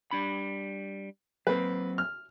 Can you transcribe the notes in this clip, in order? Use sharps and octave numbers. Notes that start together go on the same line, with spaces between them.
G3 D4 B5
F#3 A#3 C4 B4
F6